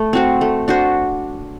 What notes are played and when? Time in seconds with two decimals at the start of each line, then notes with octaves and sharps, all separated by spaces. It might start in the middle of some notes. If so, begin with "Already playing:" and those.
Already playing: A3
0.13 C4 F#4 C5
0.41 A3
0.68 D4 F#4 C5